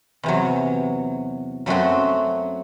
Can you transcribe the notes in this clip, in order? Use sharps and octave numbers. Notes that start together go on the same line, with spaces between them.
E2 C3 F#3
F#2 F#3 A3 C4 F#4